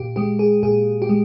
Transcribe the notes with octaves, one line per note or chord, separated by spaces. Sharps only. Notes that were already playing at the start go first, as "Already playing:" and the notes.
Already playing: A#2 G4
G#3 G4
G#4
A#2 G#4
G4
G#3